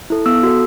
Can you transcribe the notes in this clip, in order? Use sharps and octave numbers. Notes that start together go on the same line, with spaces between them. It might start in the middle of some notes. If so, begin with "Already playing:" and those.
E4 A4
B3 E6
F#4 A4